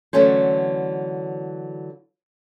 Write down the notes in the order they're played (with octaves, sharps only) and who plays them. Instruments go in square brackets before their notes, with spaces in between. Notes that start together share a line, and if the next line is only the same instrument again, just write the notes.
[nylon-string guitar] D3 E3 F#3 A3 C#4 C5